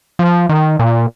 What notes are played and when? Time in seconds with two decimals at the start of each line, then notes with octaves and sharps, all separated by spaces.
0.19 F3
0.49 D#3
0.79 A#2